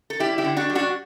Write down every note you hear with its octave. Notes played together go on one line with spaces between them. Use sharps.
A4
G3 E4 G4
E4 G4
D3
D4 F#4
G3
D4 F#4